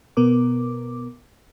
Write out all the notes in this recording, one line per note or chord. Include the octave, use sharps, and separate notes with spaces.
B2 B3 A#4 D6